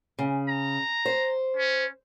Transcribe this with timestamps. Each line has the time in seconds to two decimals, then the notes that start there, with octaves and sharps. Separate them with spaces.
0.19 C#3
0.48 A#5
1.06 C5
1.57 C#4